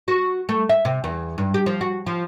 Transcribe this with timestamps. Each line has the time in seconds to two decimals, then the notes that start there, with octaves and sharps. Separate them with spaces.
0.08 F#4
0.49 A3
0.69 E5
0.85 C3
1.04 E2
1.38 G2
1.54 G4
1.66 F3
1.81 F#4
2.06 F3